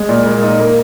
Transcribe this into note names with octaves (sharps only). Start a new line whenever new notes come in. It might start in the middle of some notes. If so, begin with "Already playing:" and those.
Already playing: G#3
A#2
A#3
D#4
A#3